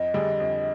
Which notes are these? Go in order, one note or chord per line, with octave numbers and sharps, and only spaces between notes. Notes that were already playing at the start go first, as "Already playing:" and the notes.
Already playing: F2 D#5
D3 G3 D4 G#4
F2